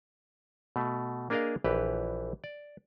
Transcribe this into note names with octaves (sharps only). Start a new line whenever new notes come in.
B2 A3
A#3 D4 G#4 A#4 D#5 F5
A#1 E3 G4 B4
D5